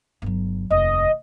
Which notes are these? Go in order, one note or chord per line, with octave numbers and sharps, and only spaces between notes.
G1 F#3
F1 D#2 D#5